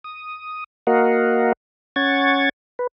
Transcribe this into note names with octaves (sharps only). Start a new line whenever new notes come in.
D#6
A#3 F#4 A#4 D#5 F5 F#5
C#4 F#5 C#6 G#6 A6
B4